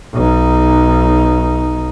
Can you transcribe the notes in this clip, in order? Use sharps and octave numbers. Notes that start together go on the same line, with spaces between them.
B1 D#4